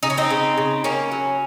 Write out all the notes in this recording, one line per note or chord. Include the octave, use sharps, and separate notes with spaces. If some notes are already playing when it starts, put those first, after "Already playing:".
C#3 D#4
C#4
C4 D#4
C#3
C#3
C#3 A#3 C#4
F#3